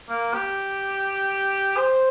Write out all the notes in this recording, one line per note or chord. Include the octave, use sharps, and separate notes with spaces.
A#3
G4
C5